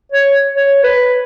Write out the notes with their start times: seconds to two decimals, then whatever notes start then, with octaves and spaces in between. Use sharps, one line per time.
0.12 C#5
0.55 C#5
0.84 B4